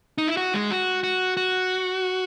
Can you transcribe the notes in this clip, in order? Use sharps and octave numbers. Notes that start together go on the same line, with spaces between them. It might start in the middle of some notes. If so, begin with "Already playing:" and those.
D#4
E4
F#4
G#3
F#4
F#4
F#4